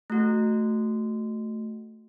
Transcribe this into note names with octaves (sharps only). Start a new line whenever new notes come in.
A3 F#4